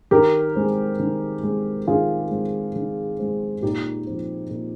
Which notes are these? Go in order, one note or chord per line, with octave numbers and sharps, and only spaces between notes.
D#3 G4 A#4
G#3 C4
D#3
G#3 C4
D#3 F4 G#4
G#3 C4
D#3
G#3 C4
A#2 D#4 G4
F3 C4
A#2